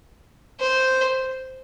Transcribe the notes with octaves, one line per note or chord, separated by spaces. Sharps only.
C5